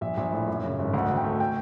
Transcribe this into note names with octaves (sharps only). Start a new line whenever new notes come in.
A#1 E5
A#1
A2
F#2
C#3
G#1
D2 F#5
D2
G5
A3
G5